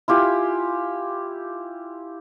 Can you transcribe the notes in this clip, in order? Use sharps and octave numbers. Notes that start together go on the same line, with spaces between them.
E4 F4 G4 G#5